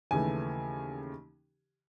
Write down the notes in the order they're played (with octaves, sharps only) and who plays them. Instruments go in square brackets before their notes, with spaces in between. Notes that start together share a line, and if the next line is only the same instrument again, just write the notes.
[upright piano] D#2 C#3 E3 A3 G#5